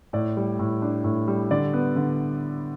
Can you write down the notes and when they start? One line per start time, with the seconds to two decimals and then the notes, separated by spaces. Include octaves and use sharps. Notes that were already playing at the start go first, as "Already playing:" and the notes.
0.13 A2 D5
0.37 G3
0.59 A2
0.82 D4
1.04 A2
1.28 G3
1.51 D3 D5
1.73 B3
1.96 D3